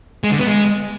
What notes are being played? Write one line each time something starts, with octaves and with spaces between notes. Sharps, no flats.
G#3
D3
B3
G#3